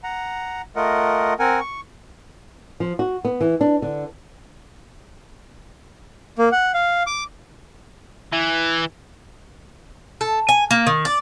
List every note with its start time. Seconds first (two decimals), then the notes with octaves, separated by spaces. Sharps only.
0.04 F#5 A#5
0.76 A3 F4 A#4 D#5 F#5
1.39 C4 A#4 F#5 G#5
1.60 C#6
2.80 F3
2.99 F#4
3.25 B3
3.41 E3
3.61 D4
3.82 D3
6.38 A#3
6.52 F#5
6.74 F5
7.07 D6
8.33 E3
10.21 A4
10.49 G#5
10.71 A#3
10.87 D#3
11.05 D5